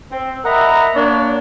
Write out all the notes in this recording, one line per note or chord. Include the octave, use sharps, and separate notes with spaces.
C4
A#4 D#5 E5 F#5 A#5 B5
A#3 D4 C#5